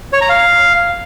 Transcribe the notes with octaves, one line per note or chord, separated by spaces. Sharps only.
C#5
A#5
F5